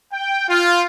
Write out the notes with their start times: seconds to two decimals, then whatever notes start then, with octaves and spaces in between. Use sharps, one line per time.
0.13 G5
0.49 F4